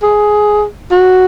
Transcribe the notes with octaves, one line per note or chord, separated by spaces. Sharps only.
G#4
F#4